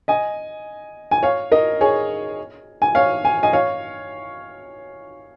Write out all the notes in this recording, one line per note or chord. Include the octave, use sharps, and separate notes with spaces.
D#5 G#5
G#5
C#5 F5
A#4 D#5
G#4 C#5
G#5
C#5 F5
G#5
D#5 G#5
C#5 F5